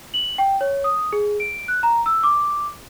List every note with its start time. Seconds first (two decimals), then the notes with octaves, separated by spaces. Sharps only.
0.14 F#7
0.38 G5
0.61 C#5
0.84 D#6
1.13 G#4
1.40 D7
1.68 F#6
1.83 A#5
2.06 E6
2.23 D6